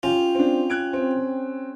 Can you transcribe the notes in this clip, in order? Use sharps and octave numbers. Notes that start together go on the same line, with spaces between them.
C#4 F4 G4
C4 D4
F#6 G#6 D7
C4